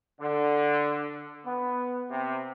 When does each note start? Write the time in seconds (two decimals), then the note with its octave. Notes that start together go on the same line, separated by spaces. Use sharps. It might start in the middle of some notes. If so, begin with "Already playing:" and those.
0.21 D3
1.45 B3
2.10 C3